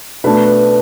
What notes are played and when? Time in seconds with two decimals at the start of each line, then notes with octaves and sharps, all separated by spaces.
0.24 B2 A3 D4 B4